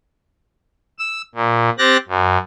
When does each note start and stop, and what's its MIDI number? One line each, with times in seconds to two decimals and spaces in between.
0.99 1.22 88
1.35 1.70 46
1.78 1.97 60
1.78 1.97 67
1.78 1.97 90
1.78 1.97 93
1.78 1.97 94
2.08 2.38 42